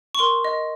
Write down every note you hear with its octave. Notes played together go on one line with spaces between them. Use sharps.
C#6
A#4 C6
D#5